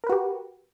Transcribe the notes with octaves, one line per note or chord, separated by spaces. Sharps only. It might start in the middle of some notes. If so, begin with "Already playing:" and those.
F#4 G4 A#4 B4